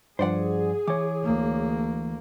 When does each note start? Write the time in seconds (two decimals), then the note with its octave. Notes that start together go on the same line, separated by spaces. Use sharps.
0.19 G2 F3 G#4 C5 D5 F#5
0.88 E3 C#5 D6
1.24 D2 A#3